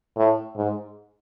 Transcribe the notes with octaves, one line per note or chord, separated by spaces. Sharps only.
A2
G#2